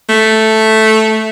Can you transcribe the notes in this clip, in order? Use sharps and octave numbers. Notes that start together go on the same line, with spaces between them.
A3